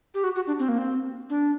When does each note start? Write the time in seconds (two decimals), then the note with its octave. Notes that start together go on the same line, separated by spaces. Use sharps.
0.15 G4
0.24 F#4
0.35 F#4
0.47 D4
0.59 C4
0.69 A#3
0.78 C4
1.30 D4